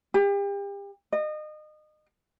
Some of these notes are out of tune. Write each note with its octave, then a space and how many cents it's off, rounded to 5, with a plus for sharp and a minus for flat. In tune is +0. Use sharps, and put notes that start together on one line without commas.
G4 +35
D#5 -30